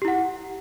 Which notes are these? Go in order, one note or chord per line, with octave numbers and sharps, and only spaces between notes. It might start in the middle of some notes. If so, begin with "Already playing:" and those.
E4 G4 F#5